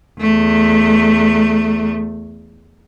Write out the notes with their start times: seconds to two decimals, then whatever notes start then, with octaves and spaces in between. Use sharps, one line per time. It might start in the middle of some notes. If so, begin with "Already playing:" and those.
0.20 E2 A3